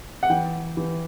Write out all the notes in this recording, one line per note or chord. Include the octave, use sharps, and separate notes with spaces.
F#5
E3 G5
E3